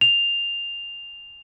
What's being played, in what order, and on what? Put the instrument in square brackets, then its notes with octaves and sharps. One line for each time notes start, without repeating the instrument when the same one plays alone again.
[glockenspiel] F7